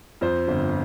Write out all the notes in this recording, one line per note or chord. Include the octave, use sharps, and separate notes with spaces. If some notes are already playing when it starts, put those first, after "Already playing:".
F2 C5
G1